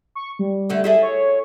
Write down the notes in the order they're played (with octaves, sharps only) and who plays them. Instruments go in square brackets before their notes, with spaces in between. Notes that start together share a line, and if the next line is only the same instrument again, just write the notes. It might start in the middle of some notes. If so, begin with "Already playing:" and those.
[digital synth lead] C#6
G3
[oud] D3 A3 D4
E4 G#4 A4
[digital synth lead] C#5